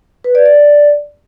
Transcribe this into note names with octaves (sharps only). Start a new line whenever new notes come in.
B4
D5
D5